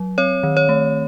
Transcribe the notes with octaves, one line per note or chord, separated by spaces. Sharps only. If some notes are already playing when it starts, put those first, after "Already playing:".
Already playing: F#3
C4 C#5
D#3
C#5
A3